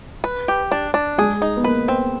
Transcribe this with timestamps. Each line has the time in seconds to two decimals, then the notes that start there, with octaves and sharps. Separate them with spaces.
0.24 B4
0.48 G4
0.72 D4
0.94 D4
1.18 G#3 G#4
1.42 D#4
1.57 B3
1.64 A#3 B4
1.88 C4